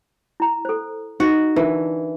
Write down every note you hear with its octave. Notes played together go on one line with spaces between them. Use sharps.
E4 A#5
A4 C5
D#4 F#4
E3 D4 E4 A#4